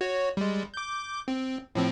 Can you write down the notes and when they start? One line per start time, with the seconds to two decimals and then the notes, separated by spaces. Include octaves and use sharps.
0.01 F#4 C#5
0.37 G3 G#3
0.74 D6 G6
1.28 C4
1.75 A2 F3 C4